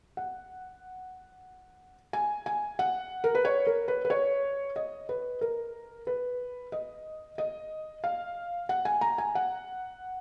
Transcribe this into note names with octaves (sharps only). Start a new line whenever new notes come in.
F#5
G#5
G#5
F#5
A#4
B4
C#5
A#4
B4
B4
C#5
D#5
B4
A#4
B4
D#5
D#5
F5
F#5
G#5
A#5
G#5
F#5